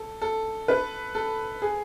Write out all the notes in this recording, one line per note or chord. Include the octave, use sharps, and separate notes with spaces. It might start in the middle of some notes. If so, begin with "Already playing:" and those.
Already playing: A4
A4
B4
A4
G#4